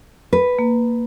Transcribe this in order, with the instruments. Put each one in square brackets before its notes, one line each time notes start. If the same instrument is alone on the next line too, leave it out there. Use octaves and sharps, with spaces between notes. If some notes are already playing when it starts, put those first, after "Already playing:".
[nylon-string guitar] B4
[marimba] A#3